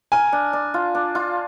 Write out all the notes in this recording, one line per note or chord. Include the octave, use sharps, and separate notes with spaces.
A#4 G#5
D4
D4
F4
D4
F4